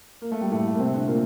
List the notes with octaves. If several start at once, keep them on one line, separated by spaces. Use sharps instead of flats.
A#3
A3
G3
A2 A3
A#3
C3 C4
D3
A#2 A#3